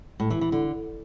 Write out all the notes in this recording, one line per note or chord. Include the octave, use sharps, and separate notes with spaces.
A2
E3
E3
D3